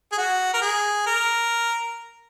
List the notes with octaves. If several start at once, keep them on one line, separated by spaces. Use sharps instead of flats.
G#4
F#4
A#4
G#4
A#4